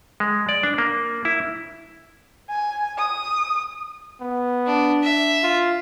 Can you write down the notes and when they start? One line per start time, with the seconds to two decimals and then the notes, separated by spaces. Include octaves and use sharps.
0.20 G#3
0.49 D5
0.63 D4
0.78 A#3
1.25 E4
2.49 G#5
2.98 D#6
4.21 B3
4.66 D4
5.03 E5
5.43 F4